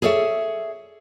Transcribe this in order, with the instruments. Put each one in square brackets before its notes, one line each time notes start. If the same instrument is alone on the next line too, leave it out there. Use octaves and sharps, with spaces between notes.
[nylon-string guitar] G#4 A4 C#5 D5 E5